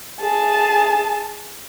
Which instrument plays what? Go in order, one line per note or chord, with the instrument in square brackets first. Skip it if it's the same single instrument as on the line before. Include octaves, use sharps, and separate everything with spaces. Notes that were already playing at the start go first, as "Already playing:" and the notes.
[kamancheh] G#4 A5